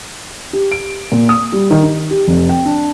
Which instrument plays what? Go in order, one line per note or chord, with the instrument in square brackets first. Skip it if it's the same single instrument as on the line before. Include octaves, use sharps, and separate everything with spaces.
[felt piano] G4
D7
A#2
D#6
G3
D#3
D#4
G4
F1
G5
D4